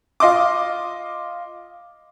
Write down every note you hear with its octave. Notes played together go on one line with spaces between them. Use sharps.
F4 D#5 C6 D6